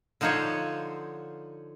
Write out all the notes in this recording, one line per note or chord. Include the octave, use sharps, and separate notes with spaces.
D3 F3 D#4 C5 C#5